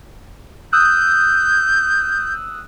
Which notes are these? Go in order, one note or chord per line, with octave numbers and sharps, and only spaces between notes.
D#6 E6 F#6 G6